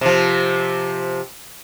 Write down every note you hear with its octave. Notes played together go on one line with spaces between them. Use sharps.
C3 F3